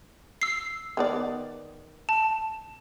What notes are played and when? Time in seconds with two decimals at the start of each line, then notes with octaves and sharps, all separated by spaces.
0.42 E6 C7
0.97 D#3 B3 D5
2.09 A5